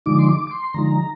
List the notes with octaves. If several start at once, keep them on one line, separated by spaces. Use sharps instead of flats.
D3 F3 G#3 D#4 D6
C6
D6
D6
C6
D3 F3 G#3 D#4 A#5